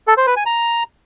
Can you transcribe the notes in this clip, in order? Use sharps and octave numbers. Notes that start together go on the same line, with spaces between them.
A4
C5
B4
G#5
A#5